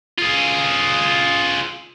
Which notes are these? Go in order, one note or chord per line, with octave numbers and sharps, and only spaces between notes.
F4 G#4